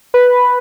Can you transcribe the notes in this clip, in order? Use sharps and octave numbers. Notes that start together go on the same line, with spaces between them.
B4